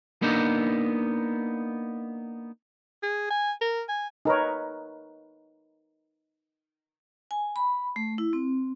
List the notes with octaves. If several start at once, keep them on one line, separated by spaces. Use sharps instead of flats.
A#3 B3 D4 D#4
G#4
G#5
A#4
G#5
D#4 A#4 B4 C#5
G#5
B5
A3
E4
C4